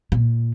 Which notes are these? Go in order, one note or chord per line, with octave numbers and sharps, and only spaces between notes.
A#2